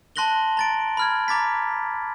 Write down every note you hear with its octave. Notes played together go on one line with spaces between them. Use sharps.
A5 C6 F#6 A#6 F#7 G7
A#5 A6 D7
B5 F6 G#6
A#5 D6 A6 B6